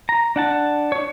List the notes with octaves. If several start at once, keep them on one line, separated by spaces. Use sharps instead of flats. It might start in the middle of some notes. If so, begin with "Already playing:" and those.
A#5
D4 F#5 A5
D4 C#5